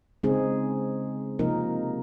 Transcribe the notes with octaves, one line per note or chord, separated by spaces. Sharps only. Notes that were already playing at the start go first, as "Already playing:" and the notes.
C#3 G#3 C4 D#4 G#4
C3 F3 A#3 D#4 A#4